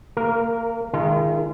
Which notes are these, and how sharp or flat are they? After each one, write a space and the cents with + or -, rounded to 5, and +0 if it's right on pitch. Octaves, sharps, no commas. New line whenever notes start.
A#3 -25 A#4 +0
D#3 -5 G#3 +0 F4 -45